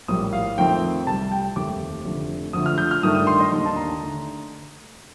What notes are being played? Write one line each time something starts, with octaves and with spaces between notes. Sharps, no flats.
A#1 A2 G3 A#3 D#6
F5
F2 D#3 A3 C4 G5
C2 C3 G3 A5
G5
F1 D#2 D#3 A3 C4 D6
F1 F2 D3 A3
F2 D3 F3 A3 D#6
F6
G6
F6
G2 D#3 A3 D4 D#6
D#6
C6
D#5
D#2 D#3 A#3 D4 C6
A5
A#5
D3 A3 D#4